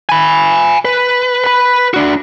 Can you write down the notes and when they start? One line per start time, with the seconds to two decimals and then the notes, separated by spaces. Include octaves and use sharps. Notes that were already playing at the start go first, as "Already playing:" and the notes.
0.09 G#5 B5
0.85 B4
1.44 B4 B5
1.94 D4 F#4